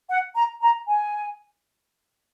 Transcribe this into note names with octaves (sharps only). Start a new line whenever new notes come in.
F#5
A#5
A#5
G#5